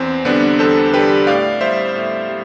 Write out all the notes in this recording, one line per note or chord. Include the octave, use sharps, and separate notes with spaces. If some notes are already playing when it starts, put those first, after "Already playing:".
Already playing: E2 C4
D3 G3 B3 D4
E2 A4 C5
D3 G3 G4 B4
A2 D5 F5
G3 C5 E5
A2
G3